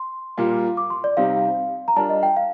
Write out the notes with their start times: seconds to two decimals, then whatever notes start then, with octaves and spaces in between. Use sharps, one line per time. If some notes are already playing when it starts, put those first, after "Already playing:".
Already playing: C6
0.38 A#2 G3 A#3 F4
0.77 D6
0.90 C6
1.04 D5
1.17 C3 G3 C4 D#4 F5
1.88 A#5
1.96 G3 D4 F4 A#4 A5
2.09 D#5
2.23 G5
2.37 F5